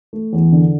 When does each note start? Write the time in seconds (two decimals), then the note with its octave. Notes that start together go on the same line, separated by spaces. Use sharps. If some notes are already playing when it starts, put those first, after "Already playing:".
0.13 A3
0.33 E2
0.52 D3